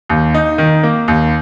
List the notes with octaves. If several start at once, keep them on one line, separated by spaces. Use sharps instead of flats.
D#2
D#4
D#3
A#3
D#2